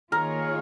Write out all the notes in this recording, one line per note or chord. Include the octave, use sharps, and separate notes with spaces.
D#3 A#3 F4 G#4 A#4 C#5